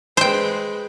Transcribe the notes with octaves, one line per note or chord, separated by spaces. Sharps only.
G#3 B4 C5 G5